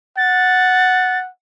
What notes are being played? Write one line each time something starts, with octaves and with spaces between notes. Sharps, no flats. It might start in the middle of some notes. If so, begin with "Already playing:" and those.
F#5 A6